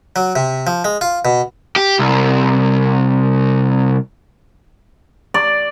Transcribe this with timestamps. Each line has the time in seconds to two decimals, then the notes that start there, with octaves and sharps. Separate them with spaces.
0.16 F#3
0.36 C3
0.67 F3
0.85 G#3
1.01 F4
1.25 B2
1.76 G4
1.99 C2
5.34 D5